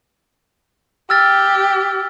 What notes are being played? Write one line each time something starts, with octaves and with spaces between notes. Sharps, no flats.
G4 E6 F6 A6